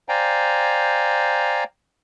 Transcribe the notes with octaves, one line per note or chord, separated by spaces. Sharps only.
C5 D5 F5 G5 G#5 A#5